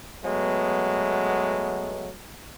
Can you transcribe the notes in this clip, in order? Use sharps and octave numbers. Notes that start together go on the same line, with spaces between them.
F#3 G#3 A3 B3